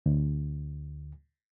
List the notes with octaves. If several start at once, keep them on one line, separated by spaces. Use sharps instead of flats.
D2